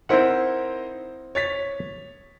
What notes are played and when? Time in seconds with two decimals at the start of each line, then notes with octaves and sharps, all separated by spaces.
0.09 C4 D#4 E4 A#4 C5 F#5
1.35 C#5 A6 B6